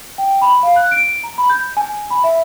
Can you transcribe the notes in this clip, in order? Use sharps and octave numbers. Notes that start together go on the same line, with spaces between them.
G5
B5
F5
F#6
D7
A#5
B5
G6
G#5
B5
E5